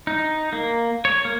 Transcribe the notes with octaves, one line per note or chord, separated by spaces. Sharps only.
D#4
A#3
C#5
A#3